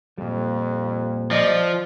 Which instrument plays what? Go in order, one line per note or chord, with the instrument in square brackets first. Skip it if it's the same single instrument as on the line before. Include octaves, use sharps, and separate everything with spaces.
[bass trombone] F2 [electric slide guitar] A#2 G3
[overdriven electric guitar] F3 [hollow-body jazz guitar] D5 D#5